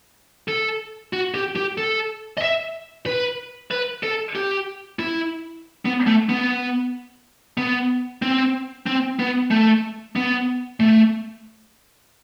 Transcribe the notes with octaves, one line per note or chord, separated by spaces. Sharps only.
A4
F#4
G4
G4
A4
D#5
E5
B4
B4
A4
G4
E4
B3
A3
B3
B3
C4
C4
B3
A3
B3
A3